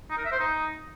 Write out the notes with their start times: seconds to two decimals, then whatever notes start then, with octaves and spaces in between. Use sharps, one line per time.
0.10 D#4
0.18 A#4
0.25 E5
0.32 C5
0.40 D#4